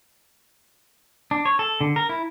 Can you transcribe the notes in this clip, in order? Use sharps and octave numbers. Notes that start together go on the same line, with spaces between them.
D4
C#5
A4
D3
A#4
E4